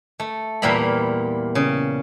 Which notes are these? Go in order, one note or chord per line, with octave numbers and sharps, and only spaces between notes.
A3
E2 A#2 G3 A#3 E5 B5
C#3